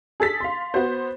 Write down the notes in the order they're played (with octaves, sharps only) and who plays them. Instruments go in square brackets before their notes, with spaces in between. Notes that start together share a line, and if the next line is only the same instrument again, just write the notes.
[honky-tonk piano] G#4 A4 A6 B6
F5 C6
B3 F#4 C5